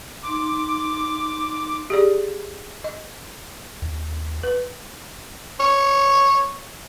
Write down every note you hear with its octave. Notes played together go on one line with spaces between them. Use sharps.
D#4 C6 D6
G4 G#4 D5
D#5
D#2
B4
C#5